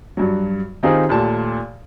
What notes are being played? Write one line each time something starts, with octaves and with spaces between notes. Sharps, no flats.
G2 F#3
D#3 C4 D#4 F4 G4 G#4
D#2 A#2 A3 A5